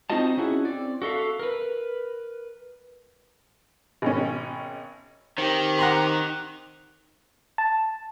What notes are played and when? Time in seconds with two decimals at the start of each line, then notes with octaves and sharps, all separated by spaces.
0.10 C4 D#4 F4 F#4 D#5 A5
0.37 C#4 E4 F#4 G#4
0.65 C4 D5
1.02 F#4 A4 E5 F5
1.39 A#4 B4
4.02 G#1 B2 C#4
5.38 D#3 C4 G4
5.79 F#5 A#5 C6
7.58 A5